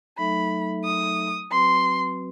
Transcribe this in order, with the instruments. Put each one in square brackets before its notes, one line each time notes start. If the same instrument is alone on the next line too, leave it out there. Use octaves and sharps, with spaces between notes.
[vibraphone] F#3 A3 D#4 A4 E5 [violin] B5
[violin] D#6
[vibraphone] F#3 C4 F#4 B4 [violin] C6